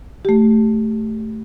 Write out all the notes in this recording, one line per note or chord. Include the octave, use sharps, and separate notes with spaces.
A3 G4